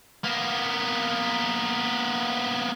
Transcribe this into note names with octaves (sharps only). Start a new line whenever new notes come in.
A#3 B3